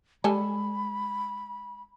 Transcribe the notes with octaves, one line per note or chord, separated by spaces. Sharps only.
G3 G#3 A4 G#5 B5